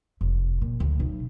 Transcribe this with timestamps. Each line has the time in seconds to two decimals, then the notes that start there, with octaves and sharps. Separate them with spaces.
0.21 F1
0.62 A#2
0.80 D2
1.00 B1